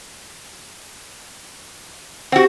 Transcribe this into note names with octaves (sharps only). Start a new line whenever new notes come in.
C4 F#4 G4 F#5